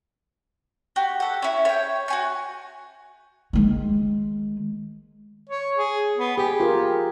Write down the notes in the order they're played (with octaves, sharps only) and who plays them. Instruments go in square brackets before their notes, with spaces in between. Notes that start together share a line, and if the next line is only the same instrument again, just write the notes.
[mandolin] F#4 G4
A4 F#5
C#4 E4
C#5 G5
F#4 G#5 C#6
[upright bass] D#3 G#3
[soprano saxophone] C#5
G#4
B3
[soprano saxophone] G4 [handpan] G#4
[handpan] F4 A#4